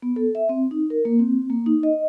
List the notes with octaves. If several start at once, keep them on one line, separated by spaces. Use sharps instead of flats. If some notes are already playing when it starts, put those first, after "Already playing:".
B3
A4
E5
C4
D#4
A#4
A#3
C4
A#3
D#4
D#5